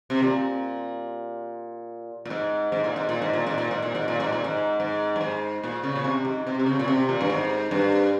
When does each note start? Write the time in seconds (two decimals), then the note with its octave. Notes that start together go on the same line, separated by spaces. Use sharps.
0.10 C3
0.23 A#2
2.25 A#2
2.30 G#2
2.72 G#2
2.84 A#2
2.96 G#2
3.09 A#2
3.22 G#2
3.33 A#2
3.46 G#2
3.58 A#2
3.71 G#2
3.82 A#2
3.95 G#2
4.08 A#2
4.20 G#2
4.32 A#2
4.44 G#2
4.80 G#2
5.16 G2
5.21 G#2
5.64 A#2
5.83 C#3
5.96 A#2
6.04 C3
6.25 G#2
6.47 C3
6.59 C3
6.66 C#3
6.79 A#2
6.88 C3
7.09 A#2
7.21 G2
7.30 G#2
7.71 G2